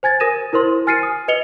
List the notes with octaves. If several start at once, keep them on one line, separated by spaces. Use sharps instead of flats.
C5 G#5 G#6 A6
A#4 D#6 A#6 D#7 E7
E4 A#4 C5 C6
G#5 F6 A6 C7 C#7 D#7
D#6
B4 D#5 C#7 F7 G7